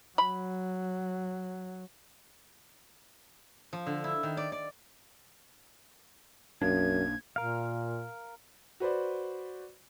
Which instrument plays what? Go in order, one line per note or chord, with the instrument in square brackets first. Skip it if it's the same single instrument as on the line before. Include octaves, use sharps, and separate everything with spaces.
[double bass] F#3 [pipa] B5
[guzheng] F3
D3
E4
D#3
D5
D5
[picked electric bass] B1 A#3 D4 [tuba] F#2 [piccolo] G#6
[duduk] A#2 [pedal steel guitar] A#4 F5
[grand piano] F#4 B4 C5 D5